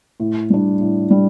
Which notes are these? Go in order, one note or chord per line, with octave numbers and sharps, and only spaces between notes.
A2
G3 D4
A2
G3 D4